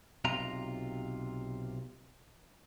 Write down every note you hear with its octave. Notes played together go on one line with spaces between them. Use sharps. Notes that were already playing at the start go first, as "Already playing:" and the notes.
B1 C3 F4 A#5